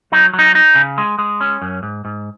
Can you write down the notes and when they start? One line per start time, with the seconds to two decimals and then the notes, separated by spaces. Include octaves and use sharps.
0.12 F#3 D#4
0.34 F#3
0.39 D#4
0.55 D#4
0.75 C#3
0.98 G#3
1.19 G#3
1.41 C#4
1.62 F#2
1.83 G#2
2.05 G#2